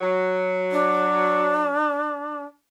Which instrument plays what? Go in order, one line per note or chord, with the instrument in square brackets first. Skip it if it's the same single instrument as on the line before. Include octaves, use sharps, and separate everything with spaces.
[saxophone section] F#3
[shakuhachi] D4